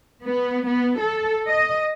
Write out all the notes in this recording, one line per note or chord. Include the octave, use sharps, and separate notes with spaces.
B3
B3
A4
D#5